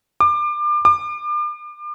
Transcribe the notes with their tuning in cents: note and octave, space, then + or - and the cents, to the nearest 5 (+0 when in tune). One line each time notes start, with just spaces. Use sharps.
D6 +30
D6 +35